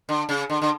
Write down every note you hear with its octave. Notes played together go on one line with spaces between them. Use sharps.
D3
C#3
D3
D3